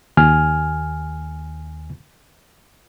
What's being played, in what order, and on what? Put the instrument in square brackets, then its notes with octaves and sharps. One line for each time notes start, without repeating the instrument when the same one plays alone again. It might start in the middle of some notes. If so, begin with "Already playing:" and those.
[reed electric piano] D#2 G#5 F6